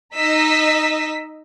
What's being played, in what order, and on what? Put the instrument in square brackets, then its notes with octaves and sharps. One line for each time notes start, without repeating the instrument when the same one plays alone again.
[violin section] D#4 D#5 E6 B6